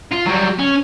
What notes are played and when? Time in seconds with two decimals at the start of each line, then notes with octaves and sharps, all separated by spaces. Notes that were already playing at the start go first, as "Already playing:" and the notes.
0.11 F4
0.26 F#3 G3
0.59 C#4